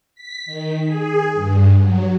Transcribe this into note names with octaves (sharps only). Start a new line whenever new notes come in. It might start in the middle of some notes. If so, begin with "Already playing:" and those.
B6
D#3
G#4
G2
F#3